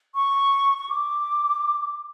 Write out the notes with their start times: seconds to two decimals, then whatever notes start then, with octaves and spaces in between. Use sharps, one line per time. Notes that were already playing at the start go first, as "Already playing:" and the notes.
0.15 C#6
0.78 C#6
0.89 D6